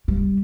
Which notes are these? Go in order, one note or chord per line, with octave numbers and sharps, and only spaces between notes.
G3